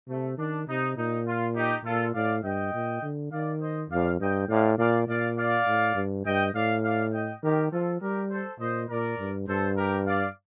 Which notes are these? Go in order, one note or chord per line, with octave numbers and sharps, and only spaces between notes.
C3 A3
D#3 D4
C3 D#4
A#2 D#4
F4
D#4 G4
A#2 F4 A4
A2 D5 F5
G2 D#5 G5
A#2
D3
D#3 D5 F5
C5 D#5
F2 D5 F5
G2 D#5 G5
A2 D5 F5
A#2 D5 F5
A#2 D5 F5
D5 F5
A2
G2
G2 D#5 G5
A2 D5 F5
D5 F5
D#5 G5
D#3 G4 A#4
F3 F4 A4
G3 G4 A#4
A4 C5
A#2 C5 D#5
A#2 A#4 D5
G2
G2 A4 C5
G4 A#4
D5 F5